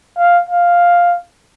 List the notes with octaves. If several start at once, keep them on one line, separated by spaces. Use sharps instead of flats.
F5
F5